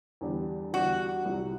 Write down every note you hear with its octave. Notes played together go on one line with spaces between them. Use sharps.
E2 D3 G3 D4 G4
E2 D3 G3 D4 F#4 G4
C2 C3 F#3